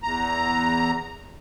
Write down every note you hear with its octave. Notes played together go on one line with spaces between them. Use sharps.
E2 A#5